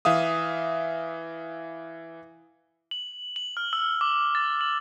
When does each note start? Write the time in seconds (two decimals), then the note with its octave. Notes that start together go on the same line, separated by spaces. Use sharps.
0.05 E3 E5 F5 D#6
2.91 F#7
3.36 F#7
3.57 F6
3.73 E6
4.01 D6
4.35 A6
4.61 F#7